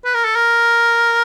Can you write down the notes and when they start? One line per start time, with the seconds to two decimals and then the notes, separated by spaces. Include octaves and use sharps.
0.05 B4
0.14 A#4
0.24 A4
0.35 A#4